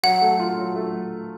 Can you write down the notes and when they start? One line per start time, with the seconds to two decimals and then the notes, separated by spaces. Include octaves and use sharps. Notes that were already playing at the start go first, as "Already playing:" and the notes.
0.03 F#3 F#5
0.21 A3
0.40 F4
0.58 F#3
0.76 A3